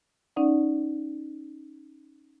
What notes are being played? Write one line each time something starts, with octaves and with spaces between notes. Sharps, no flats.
C#4 D#4 D5 F#5